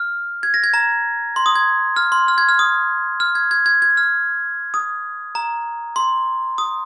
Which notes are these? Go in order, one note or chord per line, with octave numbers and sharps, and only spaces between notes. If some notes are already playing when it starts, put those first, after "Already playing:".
Already playing: F6
G#6
A#6
G#6
A#5
C6
D#6
G#6
F6
C6
F6
G#6
F6
D#6
F6
G#6
G#6
G#6
G#6
F6
D#6
A#5
C6
D#6